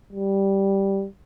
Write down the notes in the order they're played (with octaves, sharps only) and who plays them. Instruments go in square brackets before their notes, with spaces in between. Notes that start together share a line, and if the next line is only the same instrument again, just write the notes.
[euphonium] G3